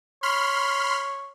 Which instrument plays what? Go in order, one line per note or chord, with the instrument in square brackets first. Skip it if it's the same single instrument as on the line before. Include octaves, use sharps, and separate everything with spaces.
[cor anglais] C#5 [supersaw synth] B5 C6 F6